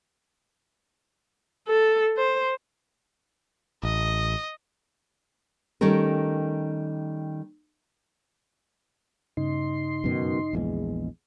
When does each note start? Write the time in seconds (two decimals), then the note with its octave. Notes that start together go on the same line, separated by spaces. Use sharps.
1.68 A4
2.18 C5
3.83 A1 D#5
5.81 D#3 G3 A3 C#4 A#4
9.37 G2 C#3 D#4 C6
10.04 F#2 B2 D#3
10.53 A#1 E2 G#3